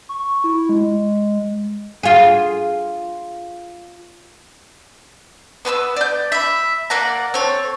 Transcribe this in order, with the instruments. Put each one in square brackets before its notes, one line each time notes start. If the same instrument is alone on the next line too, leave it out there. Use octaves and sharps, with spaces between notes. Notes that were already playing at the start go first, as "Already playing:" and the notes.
[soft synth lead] C#6
E4
G#3
[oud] F4 G#4
[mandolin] B3 B4 C6 E6
D5 G6
E5 B5
A#3 D5 F#5 A#5
C4 A4 C#5